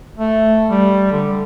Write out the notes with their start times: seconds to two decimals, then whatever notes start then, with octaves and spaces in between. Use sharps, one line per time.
0.18 A3
0.69 G3
1.12 D3